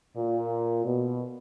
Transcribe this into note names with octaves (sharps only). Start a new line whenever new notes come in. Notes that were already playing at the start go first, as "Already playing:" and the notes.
A#2
B2